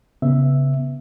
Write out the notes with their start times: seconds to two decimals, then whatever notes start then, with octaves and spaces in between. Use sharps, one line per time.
0.22 C#3 B3 E5